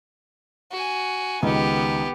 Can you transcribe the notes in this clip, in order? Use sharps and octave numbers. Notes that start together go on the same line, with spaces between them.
F#4 G#5
C#2 D#3 B3 G4 D#5